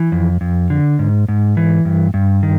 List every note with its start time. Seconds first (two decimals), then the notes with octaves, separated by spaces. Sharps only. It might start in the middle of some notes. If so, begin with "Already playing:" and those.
Already playing: E3
0.12 F2
0.41 F2
0.70 D3
0.99 G#2
1.28 G#2
1.57 E3
1.85 G2
2.14 G2
2.43 D#3